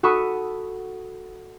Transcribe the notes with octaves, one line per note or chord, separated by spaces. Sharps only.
F#4 A4 B5 C#6 D#6